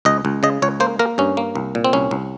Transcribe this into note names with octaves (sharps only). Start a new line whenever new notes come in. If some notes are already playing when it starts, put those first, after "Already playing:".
C#2 D#5
C#2
C#3 D#5
C#2 C#5
A#3 C5
A#3 A#4
G2 C#4
A#3
C2
A#2
C4
C2 C#4
C2